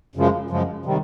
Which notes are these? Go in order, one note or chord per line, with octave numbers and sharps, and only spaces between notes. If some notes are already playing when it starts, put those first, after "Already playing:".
F#2 C#3 F3 G#3
F#2 C#3 F3 G#3
C3 D#3 G3